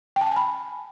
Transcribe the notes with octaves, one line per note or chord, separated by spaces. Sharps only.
G5
A5
G5
G#5
B5